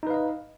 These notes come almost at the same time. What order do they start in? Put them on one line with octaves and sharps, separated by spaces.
D#4 B4 F5 D#5